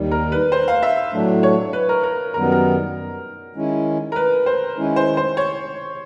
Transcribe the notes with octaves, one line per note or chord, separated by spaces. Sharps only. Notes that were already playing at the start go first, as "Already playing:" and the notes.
Already playing: D#2 D#3 G3
A#4
B4
C5
F5
E5
A2 F#3 A3 D4
C#5
B4
A#4
A#4
F#2 D#3 G3 B3 A#4
A#4
D#3 G#3 C#4 E4
A#4
B4
C5
D#3 G#3 C#4 E4
C5
C5
C#5